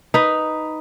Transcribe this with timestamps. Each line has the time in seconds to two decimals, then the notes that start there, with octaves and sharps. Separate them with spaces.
0.14 D#4 B4